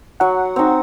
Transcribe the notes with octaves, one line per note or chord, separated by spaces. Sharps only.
F#3 F#5
C4 D#4